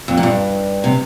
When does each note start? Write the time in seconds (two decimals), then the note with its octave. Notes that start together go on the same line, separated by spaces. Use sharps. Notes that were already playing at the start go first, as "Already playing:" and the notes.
0.08 F2
0.17 A#2
0.23 G2
0.84 C3